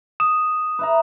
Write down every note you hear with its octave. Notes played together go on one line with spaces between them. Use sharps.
D#6 E7
B4 E5 A#5